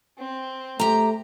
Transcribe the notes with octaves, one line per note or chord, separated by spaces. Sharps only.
C4
A3 G4 A#5